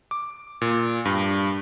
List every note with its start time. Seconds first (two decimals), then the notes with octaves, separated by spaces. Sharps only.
0.11 D6
0.61 A#2
1.05 G2